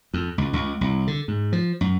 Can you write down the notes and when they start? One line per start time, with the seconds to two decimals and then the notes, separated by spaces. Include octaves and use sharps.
0.14 F2
0.38 C#2
0.53 C#2
0.81 C2
1.07 D3
1.28 G#2
1.53 F3
1.81 F#2